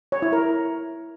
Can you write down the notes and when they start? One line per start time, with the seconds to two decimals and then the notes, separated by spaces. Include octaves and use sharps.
0.12 C#5
0.22 E4
0.33 A#4